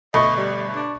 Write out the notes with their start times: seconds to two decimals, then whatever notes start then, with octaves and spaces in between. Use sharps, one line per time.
0.14 G1 B2 A3 D#5 B5 C#6
0.37 G3
0.75 D4